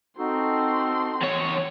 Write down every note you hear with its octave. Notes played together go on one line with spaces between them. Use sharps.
C4 D#4 F#4 A4 C6
E2 C#5